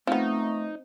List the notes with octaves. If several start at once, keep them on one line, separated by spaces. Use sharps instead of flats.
F3 A3 B3 C4 D#4